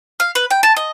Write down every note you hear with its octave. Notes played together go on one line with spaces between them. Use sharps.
F5
B4
G5
A5
D#5